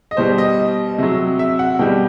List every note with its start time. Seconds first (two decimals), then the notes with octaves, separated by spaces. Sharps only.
0.11 D#5
0.17 B2 G3 C5
0.38 D#5
0.98 C3 F#3
1.39 E5
1.59 F#5
1.79 B2 G3 G5